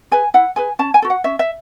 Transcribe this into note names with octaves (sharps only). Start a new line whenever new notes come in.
G#4 B4 G#5
E4 F#5
G#4 B4 G#5
C#4 A5
G#5
F#4 A4
F#5
C#4 E5
E5